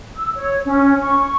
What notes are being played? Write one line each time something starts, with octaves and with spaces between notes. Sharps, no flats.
E6
C#5
C#4
C#6
C#6